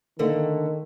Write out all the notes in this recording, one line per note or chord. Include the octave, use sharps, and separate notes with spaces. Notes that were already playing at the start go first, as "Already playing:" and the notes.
D3 D#3 A3 A#3